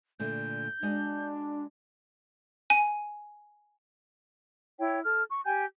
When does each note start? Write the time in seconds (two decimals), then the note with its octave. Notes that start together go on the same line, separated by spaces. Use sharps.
0.20 A#2 D3 A3 G6
0.83 G#3 D4 F#4 D#5
2.70 G#5
4.80 E4 C#5 G5
5.04 A4 F6
5.31 C#6
5.45 G4 G5 G#5 G6